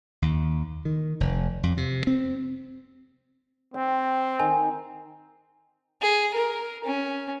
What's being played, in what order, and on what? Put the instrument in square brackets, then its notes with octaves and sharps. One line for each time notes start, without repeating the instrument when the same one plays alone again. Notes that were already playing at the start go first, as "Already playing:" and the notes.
[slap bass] D#2
D#3
F1
F2
C3
C4
[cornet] C4 [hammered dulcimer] G5
[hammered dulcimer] D#3 [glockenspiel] G#5
[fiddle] G#4
A#4
C#4